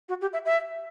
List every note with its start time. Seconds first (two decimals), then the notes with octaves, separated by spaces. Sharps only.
0.09 F#4
0.21 G4
0.33 E5
0.45 E5